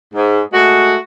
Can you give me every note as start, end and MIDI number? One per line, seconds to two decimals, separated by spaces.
0.14 0.41 44
0.53 0.96 56
0.53 0.96 57
0.53 0.96 66